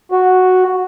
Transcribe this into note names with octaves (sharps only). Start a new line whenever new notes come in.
F#4